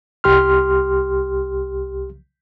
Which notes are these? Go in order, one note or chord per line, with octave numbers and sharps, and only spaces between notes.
C2 G4 C6 F6